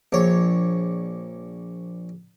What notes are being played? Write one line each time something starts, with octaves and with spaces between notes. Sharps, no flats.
A#1 C#5